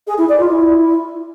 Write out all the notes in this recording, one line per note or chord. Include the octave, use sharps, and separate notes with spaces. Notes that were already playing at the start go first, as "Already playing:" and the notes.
G#4
E4
D5
F4
E4